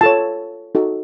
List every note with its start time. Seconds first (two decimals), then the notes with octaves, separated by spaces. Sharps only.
0.01 F4 A4 C#5 A5
0.75 D#4 F#4 A4